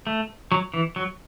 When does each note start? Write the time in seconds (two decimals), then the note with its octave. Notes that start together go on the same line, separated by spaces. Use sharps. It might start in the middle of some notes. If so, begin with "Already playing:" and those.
0.07 A3
0.52 F#3
0.74 E3
0.96 F#3